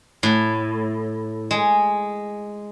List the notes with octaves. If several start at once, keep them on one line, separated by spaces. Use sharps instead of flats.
A2
G#3